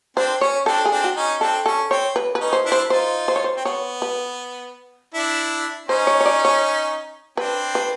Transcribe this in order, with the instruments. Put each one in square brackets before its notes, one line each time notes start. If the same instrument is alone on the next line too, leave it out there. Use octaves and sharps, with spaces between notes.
[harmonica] C4 D4 [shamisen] C5
[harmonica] C#4 [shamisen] C#5
[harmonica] C4 D4 [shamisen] A4
[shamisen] G#4
[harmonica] C4 D4
[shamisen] F#4
[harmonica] C#4 D#4
[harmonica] C4 D4 [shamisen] A4
[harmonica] C#4 [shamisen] A4
[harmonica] C4 [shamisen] C#5
[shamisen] B4
B4
[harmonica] C#4 D#4
[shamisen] C5
[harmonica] D4 E4
[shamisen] C5
[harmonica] D#4 F4 [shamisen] C5
[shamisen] C5
C#5
C5
[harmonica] C4
[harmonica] B3 [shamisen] C#5
[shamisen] B4
[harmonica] D4 E4
[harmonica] C#4 D#4 [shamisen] C5
[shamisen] C#5
C#5
D5
C#5
[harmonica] C4 D4 [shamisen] B4
[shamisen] B4